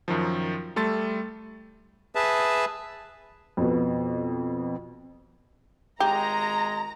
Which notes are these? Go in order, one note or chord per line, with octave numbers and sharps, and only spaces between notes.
F#2 D#3 F3
G3 A3 A4 C6 A6
G#4 B4 E5 A5
F2 B2
G#1 G#3 G4 A#5